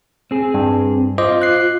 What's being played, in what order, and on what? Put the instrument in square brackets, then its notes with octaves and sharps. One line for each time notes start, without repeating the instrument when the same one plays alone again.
[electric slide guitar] C4 G#4
[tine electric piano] G2
[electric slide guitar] F4 [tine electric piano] C5 D#5 D6
[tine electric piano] F#6 C7